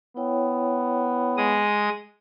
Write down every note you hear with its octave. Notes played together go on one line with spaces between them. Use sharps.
B3 E4 C#5 G5
G#3 D#6